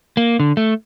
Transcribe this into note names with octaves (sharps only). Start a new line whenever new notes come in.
A#3
D3
A3